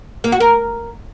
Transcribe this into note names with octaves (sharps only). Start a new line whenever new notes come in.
A#3
F#4
A#4